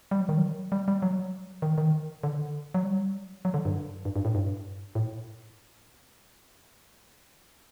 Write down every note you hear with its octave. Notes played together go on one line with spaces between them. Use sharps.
G3
F#3
D#3
F#3
G3
G3
F#3
D#3
D#3
D3
F#3
G3
F#3
D3
G2
G2
G2
A2
G2
A2